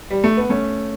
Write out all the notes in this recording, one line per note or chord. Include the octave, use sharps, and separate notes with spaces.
G3
A3
B3
A3 C#4